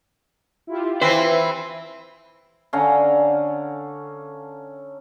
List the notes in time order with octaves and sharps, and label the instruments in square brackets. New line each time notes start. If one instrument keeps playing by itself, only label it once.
[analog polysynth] E4 F4 G4
[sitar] E3 C4 [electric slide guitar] B4 C5
[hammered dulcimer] D3 C#4 F5 A#5